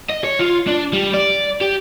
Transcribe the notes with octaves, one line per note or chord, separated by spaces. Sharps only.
D#5
C#5
F4
D4
G3
D5
G4